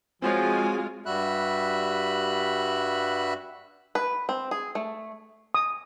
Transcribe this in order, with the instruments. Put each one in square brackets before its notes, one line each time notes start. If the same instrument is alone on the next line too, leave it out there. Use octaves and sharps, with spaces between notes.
[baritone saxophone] F3 [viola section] G#3 F4 [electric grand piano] C4 F#4 C#5 [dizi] G#5
[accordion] G2 G3 F#4 E5 B5 F#6
[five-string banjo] B4
C4
G#4
A3
[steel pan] D#6